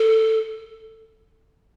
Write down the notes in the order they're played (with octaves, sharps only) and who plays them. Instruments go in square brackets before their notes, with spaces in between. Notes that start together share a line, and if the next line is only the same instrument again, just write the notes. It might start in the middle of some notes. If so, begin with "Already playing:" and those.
Already playing: [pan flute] A4